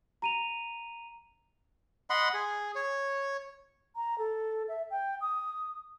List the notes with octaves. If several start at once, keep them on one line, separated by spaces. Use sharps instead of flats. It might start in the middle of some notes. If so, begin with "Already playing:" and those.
A#5 D#7 F7
D#5 F#5 B5 C6
G#4
C#5
A#5
A4
E5
G5
D#6